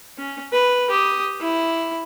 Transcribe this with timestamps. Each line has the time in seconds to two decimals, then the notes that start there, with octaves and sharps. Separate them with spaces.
0.18 C#4
0.52 B4
0.90 G4 D#6
1.41 E4